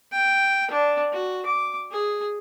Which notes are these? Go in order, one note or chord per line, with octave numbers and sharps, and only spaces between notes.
G5
D4
F#4
D6
G#4